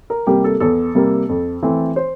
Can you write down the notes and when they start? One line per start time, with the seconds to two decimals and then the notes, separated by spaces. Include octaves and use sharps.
0.10 A#4
0.27 C3 G3 A#3 G4
0.44 A4
0.60 E2 A4
0.95 C3 G3 A#3
1.29 F2
1.63 E3 A3 C4
1.96 C5